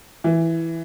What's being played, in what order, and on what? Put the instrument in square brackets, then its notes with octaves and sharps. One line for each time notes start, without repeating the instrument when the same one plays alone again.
[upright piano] E3